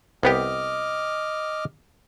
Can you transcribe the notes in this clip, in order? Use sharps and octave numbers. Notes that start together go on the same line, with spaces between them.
C2 B3 G4 D#5 D6 F6